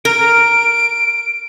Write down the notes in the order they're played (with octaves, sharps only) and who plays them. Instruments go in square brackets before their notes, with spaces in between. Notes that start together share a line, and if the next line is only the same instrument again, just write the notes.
[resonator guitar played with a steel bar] A#4 [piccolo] D7